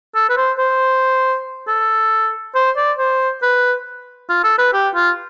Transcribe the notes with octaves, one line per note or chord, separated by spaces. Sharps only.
A4
B4
C5
C5
A4
C5
D5
C5
B4
F4
A4
B4
G4
F4